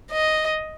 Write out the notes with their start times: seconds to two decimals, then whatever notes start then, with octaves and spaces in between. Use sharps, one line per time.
0.12 D#5